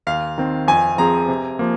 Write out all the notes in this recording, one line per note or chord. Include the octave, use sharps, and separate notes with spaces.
D#2 F5
D#3 C4
F2 G#5
F3 C4 G#4 A#5
C3
F3 A#3